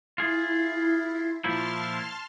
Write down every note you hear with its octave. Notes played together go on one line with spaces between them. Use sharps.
E4 F4 G#4
A#2 F3 E4 A5 C6 F6